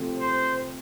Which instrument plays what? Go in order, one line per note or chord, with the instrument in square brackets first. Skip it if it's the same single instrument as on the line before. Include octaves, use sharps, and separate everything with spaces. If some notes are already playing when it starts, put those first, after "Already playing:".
Already playing: [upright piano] C3 F3 A3 C4
[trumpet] C5